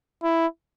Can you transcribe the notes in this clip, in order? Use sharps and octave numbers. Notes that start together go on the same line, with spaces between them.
E4